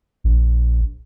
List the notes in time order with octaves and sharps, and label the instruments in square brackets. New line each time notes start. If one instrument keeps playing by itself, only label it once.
[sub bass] A#1